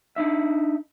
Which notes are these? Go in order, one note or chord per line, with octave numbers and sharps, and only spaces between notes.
D4 D#4 E5